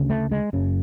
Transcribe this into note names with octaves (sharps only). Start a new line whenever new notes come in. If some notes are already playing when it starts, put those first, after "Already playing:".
Already playing: D2 C#3
A3
G#3
F#1 F#2 C#3